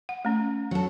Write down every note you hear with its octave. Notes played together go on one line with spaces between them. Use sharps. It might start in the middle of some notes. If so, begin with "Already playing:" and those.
F#5
A3 C#4
F#3 A4